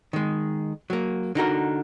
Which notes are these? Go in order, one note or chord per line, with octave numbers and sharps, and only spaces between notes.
D#3 G#3
F#3 A#3
D3 D#4 F#4 A#4